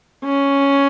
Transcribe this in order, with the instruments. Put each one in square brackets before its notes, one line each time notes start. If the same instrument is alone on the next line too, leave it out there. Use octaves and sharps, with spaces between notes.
[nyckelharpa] C#4